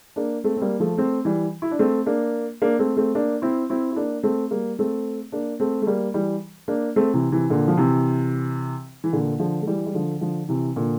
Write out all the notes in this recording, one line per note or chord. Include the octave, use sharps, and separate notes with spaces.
A#3 D4
A3 C4
C4
G3 A#3
F3 A3
A3 C4
E3 G3
E4
D4
A3 C4
A#3 D4
A#3 D4
A3 C4
A3 C4
A#3 D4
C4 E4
C4 E4
E4
A#3 D4
A3 C4
G3 A#3
A3 C4
A#3 D4
A3 C4
A3
G3 A#3
E3 G3
A#3 D4
A3 C4
C3 E3
C3 E3
A#2 D3
F3
C3 E3
E3
A#2 D3
D3 F3
A3
E3 G3
G3
D3 F3
D3 F3
C3 E3
A#2 D3